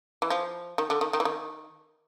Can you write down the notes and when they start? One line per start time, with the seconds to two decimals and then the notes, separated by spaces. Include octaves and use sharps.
0.22 E3
0.30 F3
0.78 D#3
0.90 D3
1.01 D#3
1.13 D#3
1.20 E3
1.25 D#3